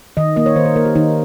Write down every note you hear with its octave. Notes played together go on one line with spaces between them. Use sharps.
D#3 D#5
A#3 D#5
C#5
D#3 C5
A#4
A#3 A#4
G4
D#3 D#4